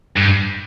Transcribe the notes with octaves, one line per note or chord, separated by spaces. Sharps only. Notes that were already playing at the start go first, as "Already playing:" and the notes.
G2